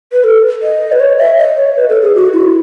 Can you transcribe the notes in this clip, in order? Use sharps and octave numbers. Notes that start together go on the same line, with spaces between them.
B4
A4
D#5
B4
C#5
E5
D#5
C#5
B4
A4
G#4
F#4
E4